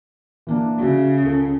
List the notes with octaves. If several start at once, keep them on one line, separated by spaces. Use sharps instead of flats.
E3 A#3 D4
C#3 F#4 E5
C#2 A4